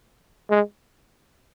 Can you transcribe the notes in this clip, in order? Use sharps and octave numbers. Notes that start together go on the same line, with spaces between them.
G#3